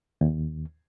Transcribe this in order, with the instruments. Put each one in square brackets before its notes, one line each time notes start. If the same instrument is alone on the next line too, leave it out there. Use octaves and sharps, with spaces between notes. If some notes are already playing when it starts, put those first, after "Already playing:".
[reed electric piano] D#2